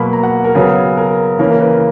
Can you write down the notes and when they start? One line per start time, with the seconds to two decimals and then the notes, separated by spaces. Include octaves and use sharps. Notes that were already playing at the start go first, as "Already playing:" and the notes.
Already playing: B2 F#3 A#3 B5
0.13 A#5
0.23 F#5
0.44 A#4
0.55 C#3 F#3 B3 G#4
0.97 A#4
1.39 C#3 E3 A#3 C#4 A#4
1.50 A#4
1.60 B4